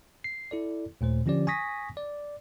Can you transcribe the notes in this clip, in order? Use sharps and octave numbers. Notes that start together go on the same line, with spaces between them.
C7
E4 A4 D5
D#2 A#2 A3 C5
D3 F3 C#4 G4 D5
G#5 C#6 D#6 A#6 B6
D5